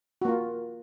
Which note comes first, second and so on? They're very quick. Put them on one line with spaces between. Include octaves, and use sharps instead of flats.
F#4 A#3 F4